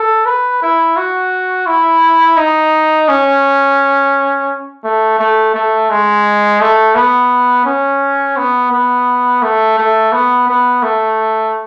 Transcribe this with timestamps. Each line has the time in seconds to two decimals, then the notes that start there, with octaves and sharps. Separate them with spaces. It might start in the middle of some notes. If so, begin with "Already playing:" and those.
Already playing: A4
0.26 B4
0.62 E4
0.97 F#4
1.67 E4
2.37 D#4
3.08 C#4
4.84 A3
5.19 A3
5.55 A3
5.90 G#3
6.61 A3
6.95 B3
7.65 C#4
8.37 B3
8.71 B3
9.42 A3
9.78 A3
10.12 B3
10.48 B3
10.83 A3